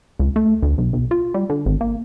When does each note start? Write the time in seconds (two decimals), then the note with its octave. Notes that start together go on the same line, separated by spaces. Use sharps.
0.19 C#2
0.36 A3
0.62 D2
0.78 B1
0.93 B1
1.11 F4
1.34 G3
1.50 D3
1.66 G#1
1.81 A#3